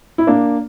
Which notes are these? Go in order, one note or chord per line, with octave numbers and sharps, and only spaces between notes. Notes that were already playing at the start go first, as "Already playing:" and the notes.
E4
A#3 D4